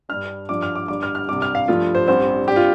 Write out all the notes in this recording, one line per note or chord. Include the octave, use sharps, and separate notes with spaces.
G2 G3 D4 F6
G2 F3 D4 D6
F6
D6
G1 G2 G3 D6
F6
F6
C2 C3 G3 D4 D6
F6
F5
G2 F3 A3 F4
C5
A1 G2 G3 C4 C5
G2 G3 C4 G4
F4